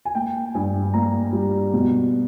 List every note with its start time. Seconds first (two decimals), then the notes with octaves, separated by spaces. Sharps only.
0.05 G#5
0.15 A#3 G5
0.54 G2 G#5
0.94 A#3 A#5
1.33 G3
1.74 B2